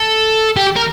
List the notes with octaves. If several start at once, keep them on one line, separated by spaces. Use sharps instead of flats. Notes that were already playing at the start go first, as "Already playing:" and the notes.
Already playing: A4
G4
A#4